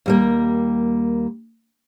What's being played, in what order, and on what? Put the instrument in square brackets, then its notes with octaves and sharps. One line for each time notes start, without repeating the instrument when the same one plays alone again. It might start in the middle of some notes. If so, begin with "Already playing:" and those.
[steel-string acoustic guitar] D#2 G3 A#3